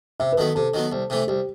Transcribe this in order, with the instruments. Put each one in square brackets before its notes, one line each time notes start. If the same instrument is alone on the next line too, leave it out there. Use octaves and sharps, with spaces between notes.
[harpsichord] C3 [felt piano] E5
[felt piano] B4
[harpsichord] D#3 F#3 B3 [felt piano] A4
[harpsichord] C3 [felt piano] A4
[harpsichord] D#3 F#3 B3
C2
C3 E3 A3
[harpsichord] C2 [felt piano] G4